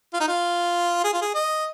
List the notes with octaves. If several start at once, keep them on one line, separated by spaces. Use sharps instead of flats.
F4
D#4
F4
G#4
F4
G#4
D#5